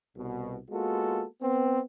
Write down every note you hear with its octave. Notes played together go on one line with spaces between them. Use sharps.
C2 B2
G#3 A#3 B3 F4 F#4 A4
B3 C4